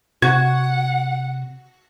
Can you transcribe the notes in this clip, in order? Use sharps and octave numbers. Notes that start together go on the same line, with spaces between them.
C3 F#4 F#5 G#6